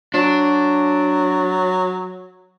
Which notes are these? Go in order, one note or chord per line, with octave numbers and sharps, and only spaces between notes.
F#3 D4